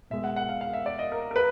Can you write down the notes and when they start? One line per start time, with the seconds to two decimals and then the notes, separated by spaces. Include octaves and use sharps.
0.10 B2 G#3 E5
0.24 F#5
0.36 F#5
0.49 F5
0.61 F5
0.73 E5
0.86 D5
0.99 D#5
1.12 A#4
1.31 A#4
1.36 B4